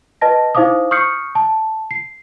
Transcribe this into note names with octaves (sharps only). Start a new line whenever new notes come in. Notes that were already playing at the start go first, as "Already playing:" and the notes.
B4 D#5 A5 A#6
D#4 E4 C5 F5 D6 D#6
C#6 D#6 F6 G6 C7 C#7
A5
C7